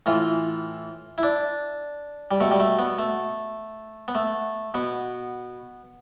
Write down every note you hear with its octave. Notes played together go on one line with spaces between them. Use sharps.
A2 E3 F4
E4
D4
G3
B2 A3
G3
A3
B3
A3
B3
A3
B2 B3